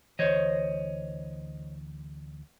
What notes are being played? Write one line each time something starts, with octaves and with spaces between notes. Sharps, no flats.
D2 E3 C5 C#5 D#5